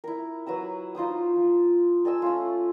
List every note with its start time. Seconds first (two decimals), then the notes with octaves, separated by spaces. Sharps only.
0.04 E4 A#4
0.46 F#3 B4 A#5 E6
0.95 D#4 F4 C5 D#6
1.36 F3
2.05 A4 D#5 G#5 E6
2.22 A3 C#4 F4